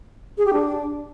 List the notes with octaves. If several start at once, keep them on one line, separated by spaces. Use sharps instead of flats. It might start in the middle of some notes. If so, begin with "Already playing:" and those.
G#4
G4
D4